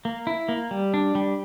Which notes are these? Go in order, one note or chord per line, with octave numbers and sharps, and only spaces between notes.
A#3
E4
A#3
G3
D4
G3